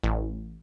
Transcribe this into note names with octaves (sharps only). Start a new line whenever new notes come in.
A1